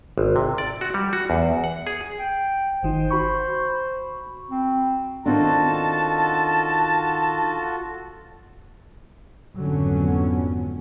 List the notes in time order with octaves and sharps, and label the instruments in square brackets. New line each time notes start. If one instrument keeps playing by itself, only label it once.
[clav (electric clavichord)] G#1
C3
D5
F#4
G3
F#4
E2
F#5
G#4
[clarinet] G5
[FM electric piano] G1 D#3 D#4 [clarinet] C5
[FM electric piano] F#4 B5 C#6
[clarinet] C4
[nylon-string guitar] D#3 C4 D4 [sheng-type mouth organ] F4 F#4 A4 [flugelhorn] A5
[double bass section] G#1 F2 D3 F#3 B3 C#4